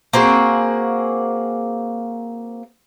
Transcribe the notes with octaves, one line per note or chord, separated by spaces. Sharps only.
A#3 C4 F#4 G#4